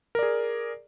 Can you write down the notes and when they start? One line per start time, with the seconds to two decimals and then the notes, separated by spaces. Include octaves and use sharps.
0.15 A#4
0.19 D5
0.23 G#4